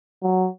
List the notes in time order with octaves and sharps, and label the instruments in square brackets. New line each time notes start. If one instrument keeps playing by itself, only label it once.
[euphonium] F#3